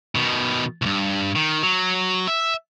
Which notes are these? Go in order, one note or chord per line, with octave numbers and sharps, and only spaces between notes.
B2 D#3
C2 G2
D#3
F#3
E5